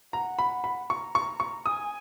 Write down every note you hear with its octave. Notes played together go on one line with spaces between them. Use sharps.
F#5 A#5
B5
B5
A#5 C#6
C#6
C#6
G#5 D#6